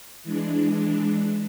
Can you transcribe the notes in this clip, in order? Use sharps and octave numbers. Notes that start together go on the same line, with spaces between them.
E3 G#3 D4